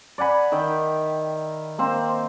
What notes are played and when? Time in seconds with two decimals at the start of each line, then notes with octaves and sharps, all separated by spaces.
0.18 D5 F#5 G#5 B5
0.52 D#3 E5 G5
1.78 A#3 C4 C5